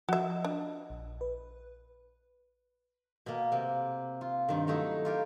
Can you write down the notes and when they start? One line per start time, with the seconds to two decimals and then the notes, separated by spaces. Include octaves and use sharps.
0.09 F3 F#4 D#5 E5
0.45 D4
0.90 A#1
1.21 B4
3.26 B2 A#3
3.52 C3 A#3
4.21 F4
4.48 G2 D#3
4.67 F#3 A3 D#4 E4
5.05 F4 G4 A#4